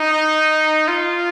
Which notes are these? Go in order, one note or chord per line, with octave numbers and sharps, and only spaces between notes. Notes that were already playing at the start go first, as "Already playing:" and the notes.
Already playing: D#4
F4